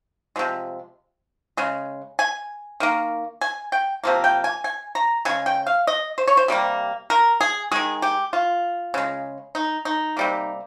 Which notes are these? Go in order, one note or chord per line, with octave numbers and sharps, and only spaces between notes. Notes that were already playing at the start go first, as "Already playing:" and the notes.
C3 F3 G#3
C#3 G#3
G#5
D#3 A#3
G#5
G5
C3 F3 A#3
G5
G#5
G#5
A#5
C#3 G#3 G#5
G5
F5
D#5
C5
C#5
C5
C3 G3 A#3
A#4
G#4
D#3 G#3 G#4
G4
F4
C#3 G#3
D#4
D#4
C3 G3 A#3